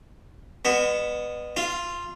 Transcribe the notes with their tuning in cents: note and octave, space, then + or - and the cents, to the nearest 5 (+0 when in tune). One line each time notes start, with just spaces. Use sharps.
G#3 -40 B3 +0
F4 +5 F5 -25